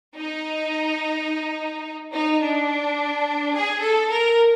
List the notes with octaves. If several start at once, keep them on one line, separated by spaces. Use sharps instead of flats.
D#4
D#4
D4
G#4
A4
A#4